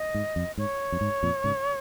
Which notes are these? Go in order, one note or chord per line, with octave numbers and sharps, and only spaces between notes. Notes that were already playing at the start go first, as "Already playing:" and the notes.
Already playing: D#5
G#2
F2
G#2 C#5
F2
G#2
F2 A#2
G#2 C#3